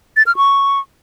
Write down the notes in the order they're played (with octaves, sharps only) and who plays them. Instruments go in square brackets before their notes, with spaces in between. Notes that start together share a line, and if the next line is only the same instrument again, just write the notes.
[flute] A6
F6
C#6